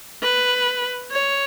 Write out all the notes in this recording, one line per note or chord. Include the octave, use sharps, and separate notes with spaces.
B4
C#5